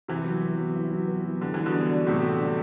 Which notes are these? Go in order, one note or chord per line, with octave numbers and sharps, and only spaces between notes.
C3 E3 E4
F#3
B3
F#3
E4
F#3
B3
F#3
D3 G4
E3 G3
B2 D3
D4
D5
A2 C3 G4
G3
D4